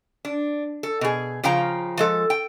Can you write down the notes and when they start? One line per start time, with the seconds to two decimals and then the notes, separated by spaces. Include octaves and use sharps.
0.25 D4
0.83 A4
1.01 B2 G#4
1.43 C#3 F3 F5 G5 A#5
1.97 F3 G#3 A4
2.30 G5